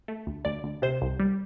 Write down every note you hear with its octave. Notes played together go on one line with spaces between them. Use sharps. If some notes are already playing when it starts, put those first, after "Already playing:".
A3
D2
D2 D5
D2
C3 C5
C2
G3